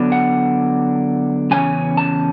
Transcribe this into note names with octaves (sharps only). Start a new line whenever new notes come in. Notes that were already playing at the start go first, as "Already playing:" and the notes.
Already playing: D3 F#3 B3 D4
F#5
E2 C#3 C#4 G#5
A5